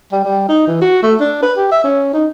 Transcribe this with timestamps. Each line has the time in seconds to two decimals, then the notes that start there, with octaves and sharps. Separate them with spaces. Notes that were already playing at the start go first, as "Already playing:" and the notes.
0.12 G3
0.24 G3
0.49 D#4
0.67 E3
0.81 F#4
1.02 A3
1.20 D4
1.43 B4
1.57 G4
1.72 E5
1.84 C#4
2.14 D#4